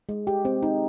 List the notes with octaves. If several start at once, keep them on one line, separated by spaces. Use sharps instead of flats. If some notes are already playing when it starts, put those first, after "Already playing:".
G#3
G4
C4
D#4